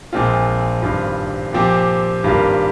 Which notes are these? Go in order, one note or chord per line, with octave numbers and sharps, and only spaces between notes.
A#1 A#2 G#3 C4 F4
G#1 G2 G3 C4 F4
A#2 F3 C4 G4
G#1 G2 G3 A#3 F4